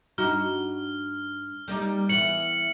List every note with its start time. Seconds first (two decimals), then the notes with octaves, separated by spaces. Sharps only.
0.18 G2 D#4 F#4 F6
1.68 G3 A#3 D#4
2.09 E3 B3 C#7 F#7